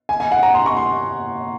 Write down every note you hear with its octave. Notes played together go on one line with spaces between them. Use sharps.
G#5
G#5
F#5
A#5
C6
C#6
C6